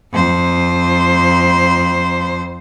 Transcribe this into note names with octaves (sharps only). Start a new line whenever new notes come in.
F2 C5